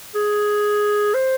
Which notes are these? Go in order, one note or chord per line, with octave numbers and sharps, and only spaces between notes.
G#4
C5